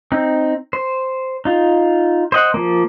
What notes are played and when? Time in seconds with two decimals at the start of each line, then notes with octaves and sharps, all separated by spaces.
0.12 C4 D#4
0.73 C5
1.45 D#4 F4
2.32 C5 D#5 F#5
2.54 F3 A#3